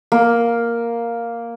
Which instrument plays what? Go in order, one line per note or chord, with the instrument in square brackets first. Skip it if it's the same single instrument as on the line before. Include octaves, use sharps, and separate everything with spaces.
[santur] A#3